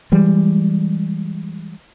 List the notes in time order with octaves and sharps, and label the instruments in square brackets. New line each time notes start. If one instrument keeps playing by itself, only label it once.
[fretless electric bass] E3 G3 G#3